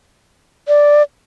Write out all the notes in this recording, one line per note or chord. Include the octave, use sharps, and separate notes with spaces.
D5